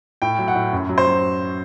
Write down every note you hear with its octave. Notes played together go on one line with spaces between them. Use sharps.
A2 G5
F#3
F#5
A2
F#2
F#3
C5
F#3